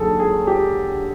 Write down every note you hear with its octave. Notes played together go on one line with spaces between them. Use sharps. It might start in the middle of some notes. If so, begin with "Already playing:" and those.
Already playing: D#2 D3 F#3 G#4 A4
G#4
G4